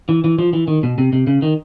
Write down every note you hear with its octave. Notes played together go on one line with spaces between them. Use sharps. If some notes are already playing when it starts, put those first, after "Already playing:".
E3
E3
F3
E3
D#3
B2
C3
C3
C#3
D#3